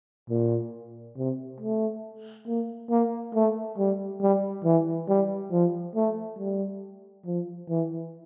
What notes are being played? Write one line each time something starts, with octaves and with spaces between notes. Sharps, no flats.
A#2
C3
A3
A#3
A#3
A3
G3
G3
E3
G3
F3
A3
G3
F3
E3